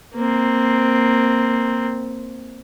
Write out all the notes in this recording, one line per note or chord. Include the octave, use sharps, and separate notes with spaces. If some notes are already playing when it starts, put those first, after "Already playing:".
A#3 C4